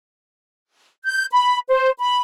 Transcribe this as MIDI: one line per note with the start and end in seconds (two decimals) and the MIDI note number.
1.04 1.26 91
1.32 1.59 83
1.69 1.91 72
2.00 2.22 83